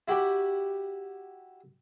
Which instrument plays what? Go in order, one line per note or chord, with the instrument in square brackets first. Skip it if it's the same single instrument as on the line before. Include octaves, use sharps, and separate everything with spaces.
[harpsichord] E4 F#4 G4